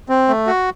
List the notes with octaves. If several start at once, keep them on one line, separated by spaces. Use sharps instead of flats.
C4
A3
F#4